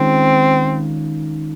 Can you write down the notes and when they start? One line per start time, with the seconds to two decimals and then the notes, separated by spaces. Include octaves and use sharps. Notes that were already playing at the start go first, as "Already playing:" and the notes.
Already playing: D#3 G#3 C4 C#4 F4